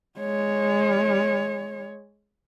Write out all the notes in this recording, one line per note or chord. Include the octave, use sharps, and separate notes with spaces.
G#3 C#5